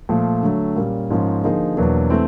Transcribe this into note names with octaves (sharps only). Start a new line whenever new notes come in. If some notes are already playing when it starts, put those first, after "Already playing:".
A#2 F3 A3
D3 F#3 A3
A#2 G3 A#3 C#4
G#2 F3 A#3 C#4
D3 F3 A#3 D#4 G#4
E2 B2 F#3 A#3 D4
E3 A3 C4